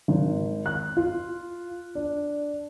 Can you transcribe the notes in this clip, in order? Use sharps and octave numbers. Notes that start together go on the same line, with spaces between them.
G#1
F#6
F4
D4